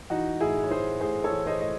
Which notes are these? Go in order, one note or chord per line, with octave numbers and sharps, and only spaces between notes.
E3 D#4 F#4
A2 E4 G#4
C#5
E3 G#4 C5
A2 G#4 C5
A4 C#5
E3
C5 D#5
A2 D#5